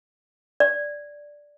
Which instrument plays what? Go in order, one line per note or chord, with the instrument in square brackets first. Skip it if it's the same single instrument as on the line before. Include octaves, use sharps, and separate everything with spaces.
[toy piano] D5